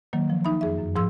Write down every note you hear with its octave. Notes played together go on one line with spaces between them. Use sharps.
D#3 F#3 A#3
F3
D#4 E5 B5
F2 G#4 E5
F#2
G#2 F3 G#4 C6 E6